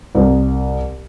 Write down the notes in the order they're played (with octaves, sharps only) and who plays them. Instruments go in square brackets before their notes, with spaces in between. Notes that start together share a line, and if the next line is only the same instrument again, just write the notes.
[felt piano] C2